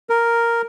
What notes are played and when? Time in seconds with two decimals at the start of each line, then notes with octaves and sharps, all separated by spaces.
0.10 A#4